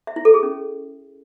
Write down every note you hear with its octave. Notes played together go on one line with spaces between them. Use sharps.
E5
E4
A4
G#4
C#4